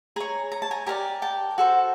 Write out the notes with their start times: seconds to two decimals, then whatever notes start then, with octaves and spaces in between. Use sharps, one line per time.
0.16 G#4 C#5 G#5 A#5
0.52 A#5
0.62 A5
0.71 G#5 A#5
0.86 G4 A#4 D5 G#5 A#5
1.22 G5 A5
1.58 F#4 A4 C5